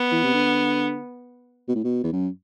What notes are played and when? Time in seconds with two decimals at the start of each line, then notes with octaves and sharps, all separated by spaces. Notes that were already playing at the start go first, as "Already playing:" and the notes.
Already playing: B3
0.12 E3
0.23 C3
0.34 D3
1.68 B2
1.75 A2
1.84 B2
2.04 E2
2.12 F#2